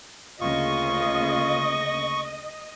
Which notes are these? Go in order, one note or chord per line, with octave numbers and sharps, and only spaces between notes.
D2 C#3 A#3 F4 D#5 C#6